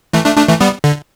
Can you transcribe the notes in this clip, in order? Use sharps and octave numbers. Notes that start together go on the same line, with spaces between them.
E3 A3
A3 D4
A3 D4
E3 A3
G3 B3
D3